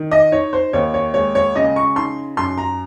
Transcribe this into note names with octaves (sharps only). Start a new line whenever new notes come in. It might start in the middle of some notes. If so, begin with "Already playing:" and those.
Already playing: D#3
D#5
D#4 C#5
C5
D#2 C#5
C#5
G#3 C#5
C#5
C#3 D#5
C#6
D#4 C6
F#2 C6
A#5